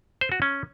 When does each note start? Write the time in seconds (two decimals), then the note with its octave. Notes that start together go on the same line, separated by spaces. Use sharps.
0.21 C5
0.32 F#4
0.42 C#4